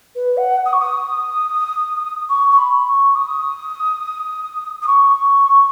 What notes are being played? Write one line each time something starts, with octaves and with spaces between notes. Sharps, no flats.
B4
F#5
D#6
C#6
D#6
C#6
C#6
B5
C#6
D#6
D#6
C#6